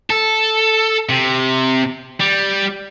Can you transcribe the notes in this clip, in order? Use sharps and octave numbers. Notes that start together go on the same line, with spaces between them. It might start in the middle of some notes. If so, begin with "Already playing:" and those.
A4
C3
G3